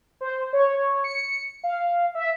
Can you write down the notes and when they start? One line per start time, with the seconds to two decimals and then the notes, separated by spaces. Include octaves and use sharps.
0.21 C5
0.53 C#5
1.04 C#7
1.64 F5
2.15 E5